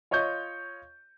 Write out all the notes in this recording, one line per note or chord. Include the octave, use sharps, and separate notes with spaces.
F4 C#5 D#5 C#6 G6